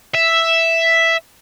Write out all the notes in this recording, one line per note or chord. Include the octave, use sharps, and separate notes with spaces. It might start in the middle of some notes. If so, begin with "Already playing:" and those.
E5